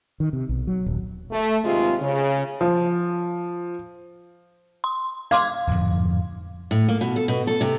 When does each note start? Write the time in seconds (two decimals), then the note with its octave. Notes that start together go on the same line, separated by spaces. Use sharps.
0.20 D#3
0.33 C3
0.49 B1
0.67 F#3
0.86 D#1
1.31 A3
1.63 D#2 C3 G#3 F4
2.00 C#3
2.61 F3
4.84 C6
5.31 F5 C6 D6 G#6
5.67 D1 F2 G#2 F3
6.71 A2
6.88 A#3
7.01 B2
7.16 A4
7.28 B2
7.47 A4
7.61 C3